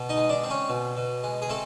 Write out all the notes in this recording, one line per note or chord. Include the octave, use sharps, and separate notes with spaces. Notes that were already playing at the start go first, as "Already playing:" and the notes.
Already playing: B2
D#4 D#5
G#3
D4 D5
C4
C#4 C#5
B2
B2
G#3
G#4
A3 C4 A4